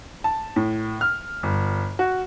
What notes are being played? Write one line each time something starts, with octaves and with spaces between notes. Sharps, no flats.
A5
A2
F6
G1
F#4